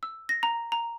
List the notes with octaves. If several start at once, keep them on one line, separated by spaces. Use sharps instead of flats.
E6
A#6
A#5
A#5